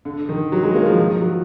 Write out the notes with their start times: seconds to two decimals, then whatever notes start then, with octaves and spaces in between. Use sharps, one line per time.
0.05 D3
0.29 D#3
0.52 F#3
0.63 G#3
0.75 A#3
0.86 F3
0.98 D#3
1.10 F3
1.21 F#3